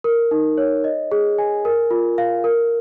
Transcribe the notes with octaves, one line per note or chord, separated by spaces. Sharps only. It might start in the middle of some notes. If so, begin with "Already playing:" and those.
A#4
D#4
C#5
D#5
G#4
G#5
A#4
F4
F5
A#4